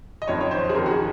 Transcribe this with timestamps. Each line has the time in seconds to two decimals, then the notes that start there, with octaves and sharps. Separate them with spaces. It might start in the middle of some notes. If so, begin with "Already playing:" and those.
0.22 D#5
0.28 F#1 F2 D#3 C#5
0.41 C#5
0.51 C5
0.69 G#4
0.75 F#1 F2 D#3 A#4
0.86 F#4
0.91 G#4